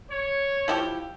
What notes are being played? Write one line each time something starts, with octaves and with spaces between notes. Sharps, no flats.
C#5
F3 E4 G4